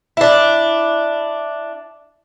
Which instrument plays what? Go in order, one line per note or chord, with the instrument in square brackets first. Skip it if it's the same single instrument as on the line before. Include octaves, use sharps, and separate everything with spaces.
[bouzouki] D4 E4